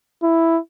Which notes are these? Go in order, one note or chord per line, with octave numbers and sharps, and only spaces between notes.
E4